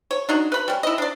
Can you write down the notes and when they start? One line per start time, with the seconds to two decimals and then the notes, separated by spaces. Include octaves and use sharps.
0.11 C#5
0.29 D4 D#4 F#4
0.52 B4 B5
0.68 G3 G#3 C#4
0.83 E4 D#5
0.98 D4 D5